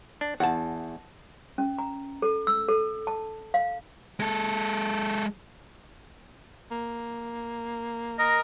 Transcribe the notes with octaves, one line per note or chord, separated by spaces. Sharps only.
D4
E2 F#5 A5
C#4
A#5
A4
E6
A4
A5
F5
G#3 A4
A#3
A#4 D#5